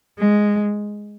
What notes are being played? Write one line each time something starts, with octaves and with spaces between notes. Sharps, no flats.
G#3